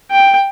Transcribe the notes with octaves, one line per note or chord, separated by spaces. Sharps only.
G5